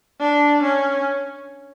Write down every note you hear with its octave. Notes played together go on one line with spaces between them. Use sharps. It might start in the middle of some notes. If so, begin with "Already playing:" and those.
D4
C#4